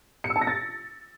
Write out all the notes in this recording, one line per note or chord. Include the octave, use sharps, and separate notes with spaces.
C#7
E6
A5
A#6
A6